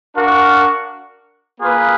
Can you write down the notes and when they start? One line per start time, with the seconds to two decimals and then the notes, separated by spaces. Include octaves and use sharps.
0.15 D4 F#4 A#4 F5
1.60 A#3 F4 G#4 B4